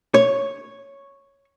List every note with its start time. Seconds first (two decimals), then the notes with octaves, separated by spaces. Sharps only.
0.14 C#5